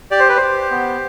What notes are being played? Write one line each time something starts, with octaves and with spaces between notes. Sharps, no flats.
G4 D5
C5
B4
C5
G4
B3